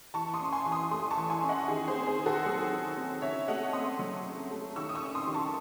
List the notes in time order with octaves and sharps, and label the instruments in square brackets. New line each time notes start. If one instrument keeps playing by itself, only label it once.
[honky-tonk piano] E3 A5 C#6
C6 D#6
C#4
G#5 C6
E3
C6 D#6
A3 C6 D#6
A5 C#6
E3
G#5 C6
C#4
D#5 F#5
D#3 G#4
G#4 C5
C4
G#4 C5
D#3
F#4 A4
F#3 G#4
D#3
C4
C#3 C#5 E5
A3 D#5 F#5
C4 C6 D#6
F#3
C#3
A3
D#3 C#6 E6
D#6
C#6 E6
C#4
C6 D#6
D#3
A5 C#6